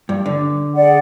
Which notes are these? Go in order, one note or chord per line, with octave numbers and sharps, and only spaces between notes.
G2
D3
G#4 D5 F#5